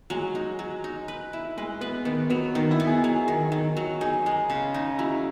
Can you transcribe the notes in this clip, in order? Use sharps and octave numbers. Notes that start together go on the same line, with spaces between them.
F#3 G#3
D#4
F#3
D#4
B4
E4
G#3 B4
B3 B4
D#3 B3
F#3 B3
D#3 D#4
E4
B3
G#4
F#3 G#4
D#3
D#3
F#3
D#4 G#4
G#3 G#4
C#3
D#4
F#3 E4